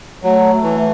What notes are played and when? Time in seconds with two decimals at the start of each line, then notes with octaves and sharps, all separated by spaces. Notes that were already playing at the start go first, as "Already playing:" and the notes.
0.23 F#3 A3
0.63 E3